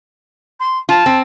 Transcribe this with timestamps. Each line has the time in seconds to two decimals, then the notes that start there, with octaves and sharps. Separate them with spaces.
0.60 C6
0.89 F4 A5
1.06 C4